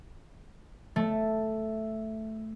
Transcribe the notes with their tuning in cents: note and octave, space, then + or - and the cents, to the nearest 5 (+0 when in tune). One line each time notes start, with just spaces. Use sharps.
A3 +0